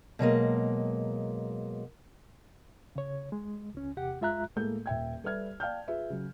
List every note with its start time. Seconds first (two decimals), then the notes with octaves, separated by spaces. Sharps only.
0.19 B2 F#3 G#3 A#3
2.96 C#3 C#5
3.32 G#3
3.74 C#2 C#4
3.97 E2 C3 G4 F#5
4.21 F#2 G#3 F4 E5 A#5 F#6
4.56 A2 G#3 A#3 A4 G6
4.86 D#1 E5 G5 G#6
5.24 G3 A4 B4 E5 F6 G#6
5.60 D5 F5 G5 A5 F6 G6
5.88 F4 G#4 B4 E5
6.10 C#3 F#3